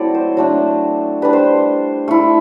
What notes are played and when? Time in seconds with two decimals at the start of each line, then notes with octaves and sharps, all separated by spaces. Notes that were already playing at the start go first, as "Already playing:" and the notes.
Already playing: F#3 A3 C4 E4 A4 D5
0.15 C5
0.37 F#3 A3 D4
1.22 G3 D4 B4
1.33 C5
2.08 A3 E4